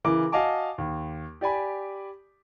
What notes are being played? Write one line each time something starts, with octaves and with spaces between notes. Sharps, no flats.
C#3 E3 A#4 D6
F#4 D#5 F5 G#5 A5 D6
D#2
G4 D5 G#5 B5